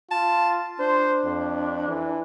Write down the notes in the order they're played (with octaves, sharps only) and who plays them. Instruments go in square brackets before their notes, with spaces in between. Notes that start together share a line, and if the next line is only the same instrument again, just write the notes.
[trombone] F4 [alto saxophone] A5
[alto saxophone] D4 [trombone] C5
[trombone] F2
E3